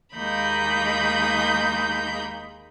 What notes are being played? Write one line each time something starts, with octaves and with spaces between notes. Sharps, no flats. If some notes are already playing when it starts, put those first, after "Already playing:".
D#2 G#3 A#3 D#4 B5 G6